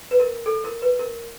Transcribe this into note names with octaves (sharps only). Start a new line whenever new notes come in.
B4
A#4
A4
A#4
B4
A#4